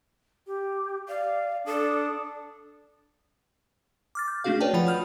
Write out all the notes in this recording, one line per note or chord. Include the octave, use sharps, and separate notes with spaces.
G4
D5 F5
D4 A4 D#6
D6 F6 A6
G6
A3 C#4 D4 F#4 G#4 F5
B4 C#5 D5 G5 A5
F3 F4 F#5 B5 F7
D#6 F6 G6